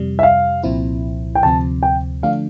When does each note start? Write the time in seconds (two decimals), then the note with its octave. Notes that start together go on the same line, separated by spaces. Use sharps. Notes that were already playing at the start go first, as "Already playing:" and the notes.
Already playing: F2 C3 G3
0.19 E5
0.23 F5
0.63 C2 A#2 F3 C4 E4
1.35 G5
1.43 D2 C3 F3 C4 A5
1.83 G5
2.23 D3 F3 A3 D4 F5